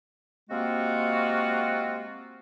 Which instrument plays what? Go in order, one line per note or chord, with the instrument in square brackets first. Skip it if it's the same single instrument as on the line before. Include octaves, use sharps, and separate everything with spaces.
[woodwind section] C3 G#3 A#3 C4 F4 F#4